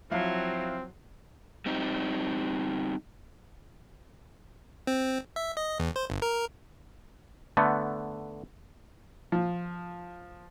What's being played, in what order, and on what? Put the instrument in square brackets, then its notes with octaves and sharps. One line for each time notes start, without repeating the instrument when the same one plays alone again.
[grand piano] F3 E4 F5 [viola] F#3 [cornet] C4
[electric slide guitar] G3 C4 D#4
[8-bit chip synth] C4
E5
D#5
E2
C5
G1
A#4
[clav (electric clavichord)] D3 A3 B3
[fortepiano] F3